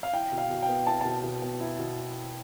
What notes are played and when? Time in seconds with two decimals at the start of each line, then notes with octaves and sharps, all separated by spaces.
0.03 F5
0.13 E4 G5
0.32 B2
0.38 F5
0.50 B2
0.62 G5
0.69 B3
0.87 E4 A5
1.01 B2 A5
1.24 B2
1.42 B3
1.60 E4
1.79 B2